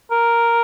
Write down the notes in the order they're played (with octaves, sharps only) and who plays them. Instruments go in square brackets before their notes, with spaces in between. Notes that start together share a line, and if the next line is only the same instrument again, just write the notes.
[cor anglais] A#4